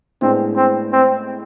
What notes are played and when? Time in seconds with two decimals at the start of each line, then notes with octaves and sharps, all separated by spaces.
0.22 A2 G#3 B3 C4 D4
0.56 C4
0.93 C4